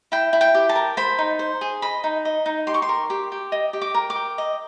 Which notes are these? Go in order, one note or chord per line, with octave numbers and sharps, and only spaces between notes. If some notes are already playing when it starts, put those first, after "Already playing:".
E4 G5
E4
G5
G4
A5
A#4
C5 B5
D#4
C5
G#4
D#5 B5
D#4
D#5
D#4
G4 C6
C#6
C6
A#4
G4
G4
D#5
G4
D6
A#4
D6
G4
D#5